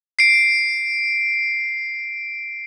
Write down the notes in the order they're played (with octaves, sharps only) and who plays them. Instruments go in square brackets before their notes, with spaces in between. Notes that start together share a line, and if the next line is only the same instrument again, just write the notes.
[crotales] C7 D7